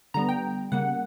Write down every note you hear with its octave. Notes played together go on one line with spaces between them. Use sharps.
D3 G3 B3 A#5
G5
C#3 G3 A#3 F#5